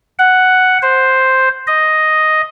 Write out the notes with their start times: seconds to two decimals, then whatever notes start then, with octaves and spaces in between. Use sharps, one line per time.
0.19 F#5
0.82 C5
1.67 D#5